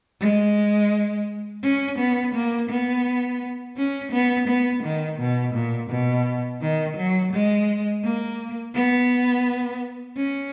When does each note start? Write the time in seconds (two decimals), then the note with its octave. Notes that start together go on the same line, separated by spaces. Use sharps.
0.21 G#3
1.63 C#4
1.99 B3
2.34 A#3
2.70 B3
3.77 C#4
4.12 B3
4.48 B3
4.84 D#3
5.19 B2
5.54 A#2
5.90 B2
6.61 D#3
6.97 F#3
7.33 G#3
8.04 A#3
8.75 B3
10.17 C#4